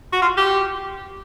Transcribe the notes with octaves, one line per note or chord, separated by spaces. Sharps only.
F#4
F4
G4